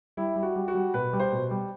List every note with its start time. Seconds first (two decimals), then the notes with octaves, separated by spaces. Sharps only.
0.17 G3 E4
0.36 G3
0.43 F#4
0.56 G3
0.68 F#4
0.75 G3
0.94 B2 B4
1.13 G3
1.20 C5
1.33 B2
1.51 G3